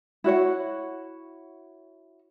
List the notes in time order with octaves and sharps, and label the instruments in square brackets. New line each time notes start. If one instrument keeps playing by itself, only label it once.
[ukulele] E4 F#4 C#5 F#5